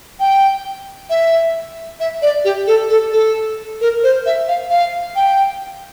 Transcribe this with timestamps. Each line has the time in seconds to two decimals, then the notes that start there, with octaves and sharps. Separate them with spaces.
0.20 G5
1.10 E5
2.00 E5
2.22 D5
2.45 G4
2.67 A4
2.90 A4
3.12 A4
3.81 A#4
4.03 C5
4.26 E5
4.48 F5
4.70 F5
5.16 G5